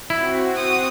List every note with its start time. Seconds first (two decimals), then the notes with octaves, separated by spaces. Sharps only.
0.10 C4 E4 F#4
0.55 D#6